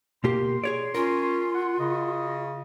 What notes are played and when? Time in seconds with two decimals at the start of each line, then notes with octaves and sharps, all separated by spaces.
0.24 B2 A#3 G4 C6
0.64 G#4 C#5 D5
0.95 C#4 F4 A#4
1.55 F#5
1.80 C#3 D#5